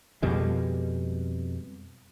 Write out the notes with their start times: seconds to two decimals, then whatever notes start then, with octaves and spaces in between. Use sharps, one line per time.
0.22 F2 B2 G3 G#3